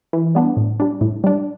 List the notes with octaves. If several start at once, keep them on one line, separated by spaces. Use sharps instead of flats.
E3
G3 B3 D4
A2
G3 D4
A2
G3 D4